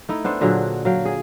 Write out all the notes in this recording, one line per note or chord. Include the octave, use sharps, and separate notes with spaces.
A3 D#4 E4
B3 D4 A4 C5
A#2 D3 F#3 G#4
F#3 F5 G5
G#4